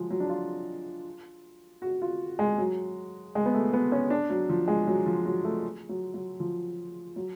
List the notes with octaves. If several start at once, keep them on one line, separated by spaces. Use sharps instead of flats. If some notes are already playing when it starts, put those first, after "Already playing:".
Already playing: F3 F#3 G#3
F#3
D4
F4
F#4
F4
G#3
F#3
G#3
B3
A3
B3
C#4
D4
F#3
F3
G#3
F#3
F3
F#3
A3
F#3
F#3
F3
F#3